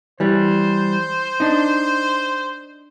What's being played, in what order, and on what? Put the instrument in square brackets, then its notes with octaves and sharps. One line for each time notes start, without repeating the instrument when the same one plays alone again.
[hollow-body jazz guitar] E3 G3 [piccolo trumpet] C5
[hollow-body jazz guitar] D4 D#4